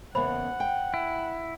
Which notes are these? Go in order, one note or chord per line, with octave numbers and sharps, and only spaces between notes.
E2 C#3 A#3 C5 F#5 B5
G5
E4